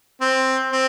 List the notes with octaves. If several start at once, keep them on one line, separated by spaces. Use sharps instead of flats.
C4
C4